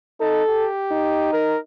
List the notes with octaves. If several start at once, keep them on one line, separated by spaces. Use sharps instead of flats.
D#4 A4
G4
D#4
A#4